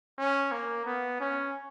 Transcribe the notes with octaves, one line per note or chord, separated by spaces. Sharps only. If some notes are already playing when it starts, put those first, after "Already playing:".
C#4
A#3
B3
C#4